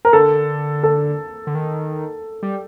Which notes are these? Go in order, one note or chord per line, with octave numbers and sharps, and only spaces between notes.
A#4
D3 A4
A4
D3
D#3
G3